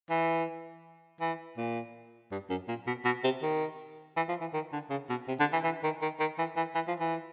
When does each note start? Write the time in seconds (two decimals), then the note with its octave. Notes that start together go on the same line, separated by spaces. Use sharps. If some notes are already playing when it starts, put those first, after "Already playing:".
0.10 E3
1.21 E3
1.57 A#2
2.32 G2
2.50 F#2
2.68 A#2
2.87 B2
3.05 B2
3.24 C3
3.43 D#3
4.17 E3
4.29 F3
4.41 E3
4.54 D#3
4.73 D3
4.90 C#3
5.09 B2
5.28 C3
5.40 D3
5.53 E3
5.64 E3
5.83 D#3
6.02 D#3
6.20 D#3
6.39 E3
6.57 E3
6.75 E3
6.88 F3
7.00 E3